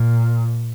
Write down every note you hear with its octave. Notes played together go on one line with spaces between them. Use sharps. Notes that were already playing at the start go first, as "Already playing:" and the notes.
Already playing: A#2